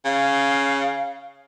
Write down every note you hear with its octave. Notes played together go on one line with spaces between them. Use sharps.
C#3 F5